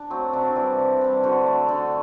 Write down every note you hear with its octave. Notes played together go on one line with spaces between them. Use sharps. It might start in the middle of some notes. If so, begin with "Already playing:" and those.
Already playing: D4
F#3 A3 C4
C3 D4
E3 G3
C3
E3 G3
D3 F#4
A3
D3